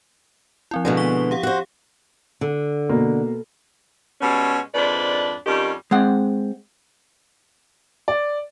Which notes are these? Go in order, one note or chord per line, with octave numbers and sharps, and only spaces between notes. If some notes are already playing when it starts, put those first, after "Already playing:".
F3 C4 E4
B2 D3 G#3
C#6 B6 G7
G4 F5 F#5
F#4 C5
D3
B2 A#3
B2 G3 G#3 C#4
F2 G#2 D4 B4 D5
F2 D#3 G3 C#4 G4
G#3 C4 F#5
D5